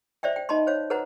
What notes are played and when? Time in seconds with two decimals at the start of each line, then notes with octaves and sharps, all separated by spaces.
0.23 C5 D5 E5 G5
0.36 G5
0.49 D#4 D#5 A5 B5 C6
0.67 C5 C#5 F5
0.90 A4 B4 C5 F#5 A#5